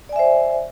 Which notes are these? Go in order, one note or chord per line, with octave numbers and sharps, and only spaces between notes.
C5 D5 E5 G#5